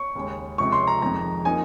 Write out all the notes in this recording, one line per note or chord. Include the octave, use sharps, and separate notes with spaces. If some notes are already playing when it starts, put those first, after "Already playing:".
Already playing: C#6
D#2 C#3 G#3
C#2 C3 F3 C#6
C6
A#5
F2 D#3 G#3 A#5
F3 A#3 D#4 G#5